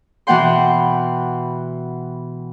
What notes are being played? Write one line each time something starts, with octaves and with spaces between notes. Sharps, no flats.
B2 E3 B3 F#5 G5 C6